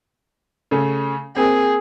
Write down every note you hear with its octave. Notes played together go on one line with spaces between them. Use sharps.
C#3 A3 C#4
A#3 C4 G#4